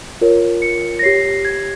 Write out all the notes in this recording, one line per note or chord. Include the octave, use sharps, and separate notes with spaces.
F4 A#4 C#5
C#7
A#6
G4 C#5 C7
G#6